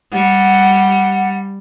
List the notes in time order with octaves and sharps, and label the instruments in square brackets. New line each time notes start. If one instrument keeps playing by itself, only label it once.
[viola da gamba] G3 [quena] F#5